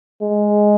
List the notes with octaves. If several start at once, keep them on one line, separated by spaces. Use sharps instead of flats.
G#3